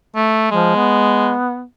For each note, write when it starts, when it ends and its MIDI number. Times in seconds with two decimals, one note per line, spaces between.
0.16 0.50 57
0.51 0.73 53
0.51 1.34 56
0.75 1.64 59